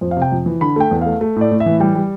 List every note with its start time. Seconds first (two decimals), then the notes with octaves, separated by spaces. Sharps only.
0.01 F2 C5
0.11 F5
0.16 C3
0.22 G5
0.32 F2
0.46 E3
0.61 D3 B5
0.76 A3 G5
0.91 E2
1.02 A3 F5
1.21 A3
1.36 A2 D5
1.51 A2
1.60 E5
1.66 E3
1.80 G3 G5
1.95 G3